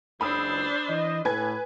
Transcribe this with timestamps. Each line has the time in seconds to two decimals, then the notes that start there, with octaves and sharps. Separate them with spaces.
0.21 F#1 C#2 D4 C5 B5 D#6 E6
0.89 E3 D#5
1.25 A2 B4 G#5 G#6